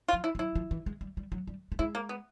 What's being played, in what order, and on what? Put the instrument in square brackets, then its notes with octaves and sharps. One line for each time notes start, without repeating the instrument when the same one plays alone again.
[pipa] F4
[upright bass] F3
[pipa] E4
[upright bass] F#3
[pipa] E4
[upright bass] F3
E3
G#3
G3
G3
F#3
G3
A3
[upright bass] G#3 [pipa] E4
[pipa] A#3
B3